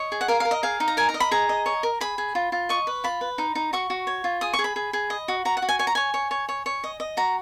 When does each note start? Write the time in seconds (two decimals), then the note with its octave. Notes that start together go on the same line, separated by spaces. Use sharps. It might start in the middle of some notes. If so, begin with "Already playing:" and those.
Already playing: C#5 D#5
0.12 G#4
0.21 F#5
0.28 A#4 F5
0.40 A#4 F5
0.51 D#5
0.63 G#4 F5
0.80 D#4
0.88 A#5
0.97 A#4 G#5
1.09 A#5
1.14 D#5
1.20 B5
1.31 G#4 A#5
1.49 D#5
1.66 C#5
1.83 A#4
2.01 G#4 B5
2.18 G#4
2.35 F4
2.52 F4
2.69 D#5 C#6
2.87 B4
3.04 F4 B5
3.21 B4
3.38 D#4
3.55 D#4
3.73 F#4 C#6
3.90 F#4
4.07 C#5
4.24 F4
4.41 G#4 D#6
4.53 C#6
4.59 G#4
4.64 B5
4.76 G#4
4.93 G#4
5.10 D#5
5.28 F#4
5.45 F#4 A#5
5.57 F#5
5.62 F#4
5.69 G#5
5.79 C#5 G#5
5.87 A#5
5.95 C#5 G#5
6.14 C#5
6.31 C#5
6.49 C#5
6.66 C#5
6.84 D#5
7.00 D#5
7.17 F#4 A#5